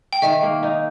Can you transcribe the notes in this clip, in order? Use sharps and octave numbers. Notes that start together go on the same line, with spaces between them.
G5
D#3 E5
A#3
D#4